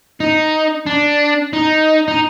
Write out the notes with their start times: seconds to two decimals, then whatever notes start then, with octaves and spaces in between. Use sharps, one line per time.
0.20 D#4
0.86 D4
1.53 D#4
2.08 D#4